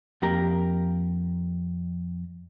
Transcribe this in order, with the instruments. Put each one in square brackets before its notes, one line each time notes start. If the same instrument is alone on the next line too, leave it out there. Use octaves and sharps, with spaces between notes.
[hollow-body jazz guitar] F2 A#3 G4 A#4 A#5